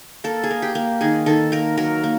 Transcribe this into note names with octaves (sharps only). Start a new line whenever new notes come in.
A#3 A4
G#4
A#3
G4
A#3
D#3 G#4
D#3 A4
A#3 A#4
F#3 A#4
A#3